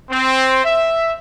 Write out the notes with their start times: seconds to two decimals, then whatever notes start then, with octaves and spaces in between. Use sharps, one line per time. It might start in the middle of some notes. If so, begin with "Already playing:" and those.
0.11 C4
0.64 E5